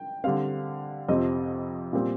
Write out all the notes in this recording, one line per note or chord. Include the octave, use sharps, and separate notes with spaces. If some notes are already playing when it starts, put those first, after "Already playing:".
Already playing: G5
D3 G3 C4 F5
F2 C3 F3 C4 D#5
A#2 G3 C4